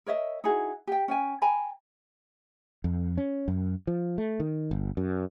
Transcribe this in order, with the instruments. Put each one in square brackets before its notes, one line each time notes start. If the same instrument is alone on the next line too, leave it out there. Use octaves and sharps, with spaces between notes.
[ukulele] A#4 C#5 D#5 E5
D#4 E4 F#4 G#4
G4 G5
C#4 G5 G#5
G5 G#5 A#5 B5
[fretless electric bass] F2
C#4
F#2
F3
A3
D#3
G1
F#2